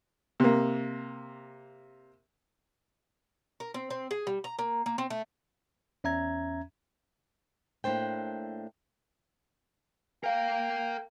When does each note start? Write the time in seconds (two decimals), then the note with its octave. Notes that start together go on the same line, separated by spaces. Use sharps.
0.40 C3 A#3
3.60 A#4
3.74 C4
3.90 C4
4.11 G#4
4.27 G3
4.44 A#5
4.59 A#3
4.86 A#3
4.98 C4
5.10 A3
6.04 E2 C#4 E5 A#5 G#6
7.84 A2 A#3 D4 C5 G5
10.24 A#4 F5 G5